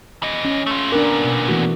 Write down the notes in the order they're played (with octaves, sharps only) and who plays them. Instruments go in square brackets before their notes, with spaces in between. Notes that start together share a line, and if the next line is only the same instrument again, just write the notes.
[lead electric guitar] E3 D#5
[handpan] C#4
[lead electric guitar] A3 F4
[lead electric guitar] A#2 B3 [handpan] D4 A#4
[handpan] B2
E3 A3 F#4